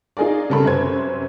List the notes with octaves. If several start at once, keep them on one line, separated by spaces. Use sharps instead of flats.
D#4 F4 G#4 A#4 D5
C#3 G3 A4 A#4 B5
F#2 C3 B4 C5 G#6